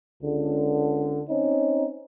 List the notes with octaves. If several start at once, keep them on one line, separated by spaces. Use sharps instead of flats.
C#2 D3
C4 C#4 D#4